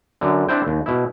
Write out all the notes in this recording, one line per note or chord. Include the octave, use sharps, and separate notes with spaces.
F#2 D3
C4 D4 E4 C5 G5
D#2
B2 E4